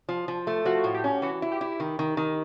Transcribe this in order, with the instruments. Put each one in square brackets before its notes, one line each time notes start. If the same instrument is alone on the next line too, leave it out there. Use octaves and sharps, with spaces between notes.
[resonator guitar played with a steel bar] F3
F3
A3
[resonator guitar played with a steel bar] F3 [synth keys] F#4
[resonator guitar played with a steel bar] A2
[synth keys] G4
[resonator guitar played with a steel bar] C#4
[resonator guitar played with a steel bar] E3 [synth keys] F#4
[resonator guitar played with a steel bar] E4
[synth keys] G4
[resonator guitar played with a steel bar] E4
D#3
D#3
D#3